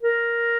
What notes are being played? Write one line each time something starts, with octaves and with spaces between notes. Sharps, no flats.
A#4